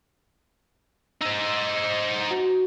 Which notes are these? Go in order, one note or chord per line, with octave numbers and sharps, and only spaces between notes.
D#4 C5 E6
F#4